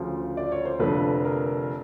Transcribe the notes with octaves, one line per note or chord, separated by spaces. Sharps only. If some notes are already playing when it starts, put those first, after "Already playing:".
Already playing: D2 C#3 F3
D5
C#5
C5
F1 F2 D3 B4
A#4